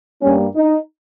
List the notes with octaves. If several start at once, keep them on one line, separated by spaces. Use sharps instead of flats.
G2 G3 A#3 C#4
D#4